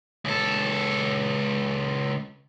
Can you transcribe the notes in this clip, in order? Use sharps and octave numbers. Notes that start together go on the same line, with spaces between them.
C#2 A4